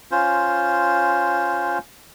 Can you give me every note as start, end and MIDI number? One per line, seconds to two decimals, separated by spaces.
0.11 1.78 61
0.11 1.78 65
0.11 1.78 72